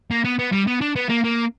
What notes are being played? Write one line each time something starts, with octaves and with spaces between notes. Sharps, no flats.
A#3
B3
B3
G3
B3
D4
B3
A#3
A#3